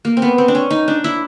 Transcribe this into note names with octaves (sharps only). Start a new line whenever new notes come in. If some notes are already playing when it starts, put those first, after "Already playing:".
A#3
C4
B3
C4
D4
C#4
D#4
D4
E4